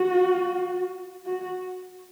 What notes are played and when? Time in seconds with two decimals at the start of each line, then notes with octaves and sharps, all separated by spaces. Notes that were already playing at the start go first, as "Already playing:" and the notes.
Already playing: F#4
1.26 F#4